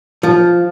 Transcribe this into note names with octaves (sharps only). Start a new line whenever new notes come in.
F3